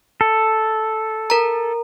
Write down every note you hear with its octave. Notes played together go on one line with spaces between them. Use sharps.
A4
A#4 A#5